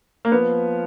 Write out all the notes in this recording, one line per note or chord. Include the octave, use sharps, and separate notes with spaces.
A#3
F3 B3